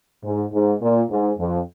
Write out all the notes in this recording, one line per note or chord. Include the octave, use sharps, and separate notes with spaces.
G#2
G#2
A#2
G#2
F2